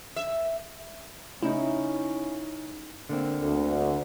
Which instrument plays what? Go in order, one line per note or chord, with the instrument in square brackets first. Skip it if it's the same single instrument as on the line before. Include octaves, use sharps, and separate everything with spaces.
[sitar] E5
[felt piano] C#3 D#4 [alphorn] C#4 [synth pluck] E4
[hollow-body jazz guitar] D3 A#3 C4
[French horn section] D2